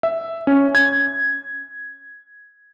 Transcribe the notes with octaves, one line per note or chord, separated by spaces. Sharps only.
E5
C#4
G#6